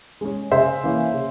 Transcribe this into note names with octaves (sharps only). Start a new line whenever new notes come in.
G#3 C#4
C#3 C5 E5
E3 A#3 C#4
C#3